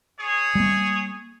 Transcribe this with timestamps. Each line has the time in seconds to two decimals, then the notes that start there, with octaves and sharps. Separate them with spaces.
0.19 G#4 C#5 D#6
0.55 G3 A#3